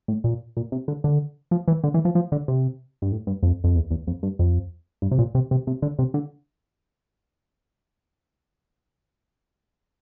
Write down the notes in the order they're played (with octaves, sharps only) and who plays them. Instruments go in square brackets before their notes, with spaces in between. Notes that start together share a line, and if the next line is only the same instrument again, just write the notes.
[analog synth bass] A2
A#2
A#2
C3
D3
D3
F3
E3
D3
E3
F3
F3
D3
C3
G2
A2
G2
F2
F2
E2
E2
F2
G2
F2
G2
C3
A#2
C3
C3
C3
D3
C3
D3